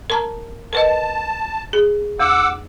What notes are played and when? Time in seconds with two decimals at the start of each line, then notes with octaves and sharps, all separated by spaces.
0.10 A#4 A5 A#5
0.73 A#4 B4 D#5 A5
1.73 G#4
2.20 E2 F#5 D6 E6